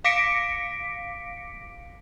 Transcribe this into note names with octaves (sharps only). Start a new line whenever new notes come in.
F5 D6 A#6 B6 C#7 D7